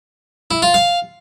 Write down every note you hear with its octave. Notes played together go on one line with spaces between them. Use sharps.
E4
F4
F5